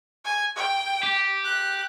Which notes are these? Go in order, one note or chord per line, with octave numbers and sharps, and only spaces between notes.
G#5
G5
G4
F#6